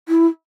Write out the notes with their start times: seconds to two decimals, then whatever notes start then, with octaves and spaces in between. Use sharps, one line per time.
0.09 E4